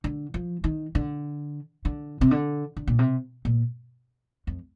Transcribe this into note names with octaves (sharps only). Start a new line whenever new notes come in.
D3
F3
D#3
D3
D3
C3
D3
D3
A#2
C3
A#2
F2